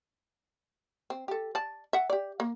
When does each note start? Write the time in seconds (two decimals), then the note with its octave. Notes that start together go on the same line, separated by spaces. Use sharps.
1.10 C4
1.28 G4 A4
1.55 D5 A5
1.93 E5 F#5
2.10 G4 D5
2.40 A#3